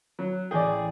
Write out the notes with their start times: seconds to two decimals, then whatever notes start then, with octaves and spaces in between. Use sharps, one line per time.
0.19 F#3
0.51 A1 G#4 D5 G5